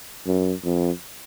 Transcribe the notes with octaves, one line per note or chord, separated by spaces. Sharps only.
F#2
F2